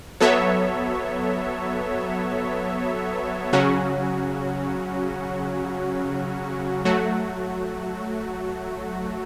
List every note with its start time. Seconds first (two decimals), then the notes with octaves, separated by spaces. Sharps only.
0.20 F#3 B3 A4 C#5 E5
3.53 C#3 F#3 C#4 F#4
6.85 F#3 A3 F#4